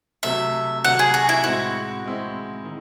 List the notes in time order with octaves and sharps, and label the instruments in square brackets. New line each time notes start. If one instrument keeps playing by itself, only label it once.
[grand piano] C3 F#3 A3 [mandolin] E5
[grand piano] C3 F#3 A3 [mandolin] F#5
[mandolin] G#4
F#4
E4
[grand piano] A2 G#3 C4 E4 [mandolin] F#4
[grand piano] A2 G#3 C4 E4
D#3